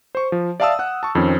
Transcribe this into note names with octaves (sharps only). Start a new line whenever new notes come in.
C5 C#6
F3
D5 E5 F5 A5 D#6 E6
F#5 F#6
A5 C#6
F2 D#3 C4 C#4